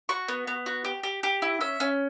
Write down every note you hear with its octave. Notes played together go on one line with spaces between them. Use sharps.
F#4 C#6
B3
B3
F#4
G4
G4
G4
E4
C#4 E5
C#4